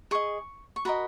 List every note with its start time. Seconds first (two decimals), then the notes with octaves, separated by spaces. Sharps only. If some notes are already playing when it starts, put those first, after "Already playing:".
0.11 G#4 D#5 C#6
0.76 C#6
0.85 F#4 A#4 D#5 B5